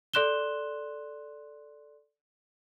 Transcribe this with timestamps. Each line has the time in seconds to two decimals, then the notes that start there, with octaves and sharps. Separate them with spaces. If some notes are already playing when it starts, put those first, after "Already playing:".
0.13 A4 D5 C6 F#6 E7 G7